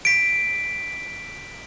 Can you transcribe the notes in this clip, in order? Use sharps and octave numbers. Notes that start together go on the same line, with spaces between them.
B6 D7